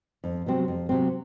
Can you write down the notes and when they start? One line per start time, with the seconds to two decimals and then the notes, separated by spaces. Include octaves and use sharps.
0.24 F2
0.46 C3 F#3 C4
0.68 F2
0.89 C3 F#3 C4